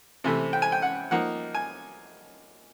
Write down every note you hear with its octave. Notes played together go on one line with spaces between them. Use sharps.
C3 E3 A3
G5
G#5
G5
F#5
F3 A#3 D#4 F#5
G#5